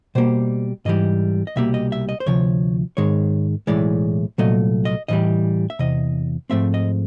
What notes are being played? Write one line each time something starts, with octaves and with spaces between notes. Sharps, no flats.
B2 G3 A#3 C5
G#2 E3 G3 D#5
D#5
C2 B2 G3 A#3 E5
D#5
E5
D#5
C5
D2 C3 F3 C#5
G#2 D#3 G#3 C#5
B1 A2 E3 G#3 D5
C2 A#2 F#3 A3 D#5
D#5
A2 E3 G3 D#5
E5
E2 C3 D#5
G#2 F3 A3 C4 E5
D#5